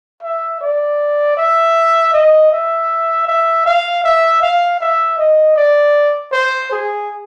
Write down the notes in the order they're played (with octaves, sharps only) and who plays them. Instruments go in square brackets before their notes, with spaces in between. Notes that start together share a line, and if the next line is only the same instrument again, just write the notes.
[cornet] E5
D5
E5
D#5
E5
E5
F5
E5
F5
E5
D#5
D5
C5
G#4